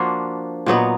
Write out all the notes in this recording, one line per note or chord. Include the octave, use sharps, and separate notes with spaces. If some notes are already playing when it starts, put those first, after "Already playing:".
Already playing: F3 A#3 D4 F#4
A#2 F#3 B3 D#4